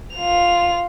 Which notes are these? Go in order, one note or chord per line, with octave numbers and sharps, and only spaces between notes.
F4 F7